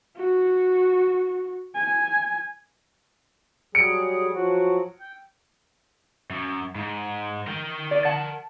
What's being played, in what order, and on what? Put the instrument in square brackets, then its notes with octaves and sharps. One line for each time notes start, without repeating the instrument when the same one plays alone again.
[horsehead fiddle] F#4
G#5
[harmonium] F#3 G3 G#4 [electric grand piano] C#7 D7
[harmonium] F3 F#3 F#4
G5
[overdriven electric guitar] F#2
G#2
A#4 G5
[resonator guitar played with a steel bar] D5
F#5 A5